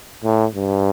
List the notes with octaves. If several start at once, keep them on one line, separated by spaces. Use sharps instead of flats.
A2
G2